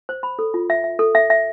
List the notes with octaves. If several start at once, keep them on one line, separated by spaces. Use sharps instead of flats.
C5
B5
A4
F4
E5
E5
A4
E5
E5